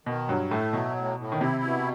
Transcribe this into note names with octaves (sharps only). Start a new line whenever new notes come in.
B2 D#3
G2 F#3
A2 A3
B2 F#3
A2
A2
D#3
C3 E4
B2